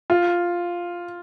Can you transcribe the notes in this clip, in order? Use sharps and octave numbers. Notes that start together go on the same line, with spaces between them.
F4